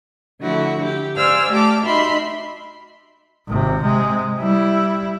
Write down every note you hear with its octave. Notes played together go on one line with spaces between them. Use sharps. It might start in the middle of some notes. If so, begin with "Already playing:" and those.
D3 F3 A3 E4 F#4
G4
C5 D5 F5 G#5 E6 F6
A3 G4 D5 A5 D6 F6
D#4 F#4 E5 B5 C6
G#1 C3
C3 G#3
G3 E4